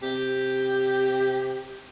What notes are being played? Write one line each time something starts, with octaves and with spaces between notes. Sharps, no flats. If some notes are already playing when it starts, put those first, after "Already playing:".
C3 G4